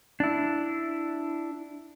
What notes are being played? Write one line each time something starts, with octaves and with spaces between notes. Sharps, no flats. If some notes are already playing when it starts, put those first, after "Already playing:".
D4 E4